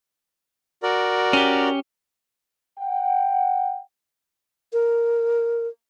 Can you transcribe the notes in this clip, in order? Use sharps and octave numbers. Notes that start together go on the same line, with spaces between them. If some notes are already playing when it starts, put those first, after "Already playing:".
F#4 A#4 D5
C#4 G4
F#5 G5
A#4